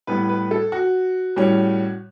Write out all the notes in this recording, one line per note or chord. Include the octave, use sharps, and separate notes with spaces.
A2 G3 B3 B4
B4
A4
F#4
A2 G3 C#4